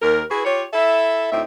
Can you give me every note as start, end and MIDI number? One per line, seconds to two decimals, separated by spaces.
0.02 0.23 39
0.02 0.23 70
0.30 0.41 64
0.30 0.41 66
0.30 0.41 68
0.30 0.41 71
0.45 0.64 65
0.45 0.64 67
0.45 0.64 73
0.73 1.32 64
0.73 1.32 69
0.73 1.32 76
1.32 1.42 38
1.32 1.42 45
1.32 1.42 60
1.32 1.42 63
1.32 1.42 76